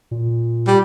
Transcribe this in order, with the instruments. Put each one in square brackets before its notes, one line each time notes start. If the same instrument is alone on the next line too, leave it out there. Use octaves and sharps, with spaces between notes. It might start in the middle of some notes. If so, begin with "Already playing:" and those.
[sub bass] A#2
[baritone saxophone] G3